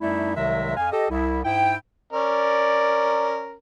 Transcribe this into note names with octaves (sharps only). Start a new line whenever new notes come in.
F#2 G3 A3 D#4 E4
C2 C3 D#3 F#3 G#3 E5
F2 F5 G#5
G4 A4 D#5
C2 E4
G#2 E4 G5
C#4 A#4 D5